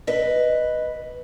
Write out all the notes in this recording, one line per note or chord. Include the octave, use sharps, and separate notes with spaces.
B4 D#5